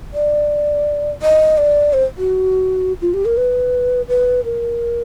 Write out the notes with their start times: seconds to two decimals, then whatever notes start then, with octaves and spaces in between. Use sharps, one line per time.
0.14 D5
1.22 D#5
1.58 D5
1.93 C5
2.18 F#4
3.02 F4
3.14 G4
3.25 A#4
3.37 B4
4.08 B4
4.45 A#4